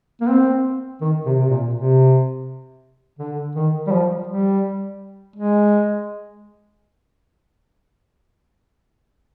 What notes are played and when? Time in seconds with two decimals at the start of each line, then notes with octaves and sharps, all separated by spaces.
0.21 A#3
0.29 C4
1.01 D#3
1.26 C3
1.40 C3
1.50 A#2
1.74 C3
3.19 D3
3.55 D#3
3.87 G3
3.92 F3
4.27 G3
5.36 G#3